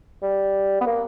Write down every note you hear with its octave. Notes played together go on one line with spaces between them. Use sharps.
G3
B3
A#3